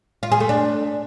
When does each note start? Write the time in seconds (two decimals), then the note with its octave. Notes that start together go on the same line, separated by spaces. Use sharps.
0.23 F4
0.32 G#4
0.40 A3
0.49 D4